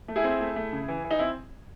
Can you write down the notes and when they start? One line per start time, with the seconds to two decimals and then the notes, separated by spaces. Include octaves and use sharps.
0.08 A3
0.16 E4 G#4
0.24 C4
0.40 A3
0.56 A3
0.73 C#3
0.88 E3
1.04 E3
1.11 D#4
1.19 C4 E4